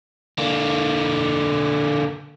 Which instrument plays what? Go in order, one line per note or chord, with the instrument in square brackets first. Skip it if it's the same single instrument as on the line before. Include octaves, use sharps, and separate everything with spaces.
[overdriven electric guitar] D3 A#3